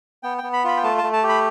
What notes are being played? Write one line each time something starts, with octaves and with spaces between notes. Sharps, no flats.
B3 G5
G5
B3
B5
F4 B5
G5
A3 A5
A5
A3
A5
G4
B5